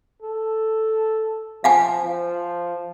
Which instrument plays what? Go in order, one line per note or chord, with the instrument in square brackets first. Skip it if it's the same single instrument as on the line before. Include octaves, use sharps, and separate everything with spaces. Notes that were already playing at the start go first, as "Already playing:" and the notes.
[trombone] A4
[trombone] F3 [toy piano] F5 F#5 G#5
[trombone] F3